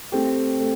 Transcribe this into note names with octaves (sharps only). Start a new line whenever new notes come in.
A3 C4 G4
A3